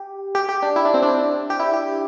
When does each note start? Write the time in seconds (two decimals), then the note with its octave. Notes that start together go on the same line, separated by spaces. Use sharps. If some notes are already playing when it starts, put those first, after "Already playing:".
Already playing: G4
0.35 G4
0.49 G4
0.62 D4
0.76 E4
0.85 D4
0.94 C4
1.02 D4
1.50 G4
1.59 E4
1.73 G4